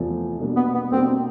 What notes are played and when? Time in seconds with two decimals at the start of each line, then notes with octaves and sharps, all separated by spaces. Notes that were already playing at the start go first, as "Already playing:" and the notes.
Already playing: E2 C3 F3 A3
0.39 B2 G3 A#3 D4
0.56 B3
0.74 B3
0.91 B2 G3 A#3 C4 D4